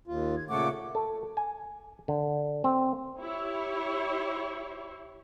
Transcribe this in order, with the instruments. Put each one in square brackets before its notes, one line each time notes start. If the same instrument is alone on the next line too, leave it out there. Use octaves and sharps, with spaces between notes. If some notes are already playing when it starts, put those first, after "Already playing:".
[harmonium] D#2 F4
[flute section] G#6
[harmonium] A#2 C#3 A3 [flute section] F#5 C#6 D6
[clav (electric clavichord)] A4
G#5
D3
C4
[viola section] E4 G4 C#5